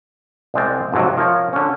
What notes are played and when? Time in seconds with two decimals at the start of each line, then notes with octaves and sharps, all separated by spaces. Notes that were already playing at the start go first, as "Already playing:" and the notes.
0.54 C2 G3 G#3 C4 D5
0.92 F2 G#2 C3 F#3
1.17 F3 A#4 C#5
1.53 D3 C#4